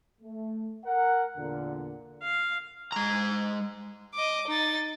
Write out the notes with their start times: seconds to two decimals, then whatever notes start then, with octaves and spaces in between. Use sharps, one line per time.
0.21 A3
0.85 A#4 F#5
1.37 E2 A#2 D3
2.23 F5
2.92 G#3 A#5
4.14 D#5 D6
4.48 D#4 A6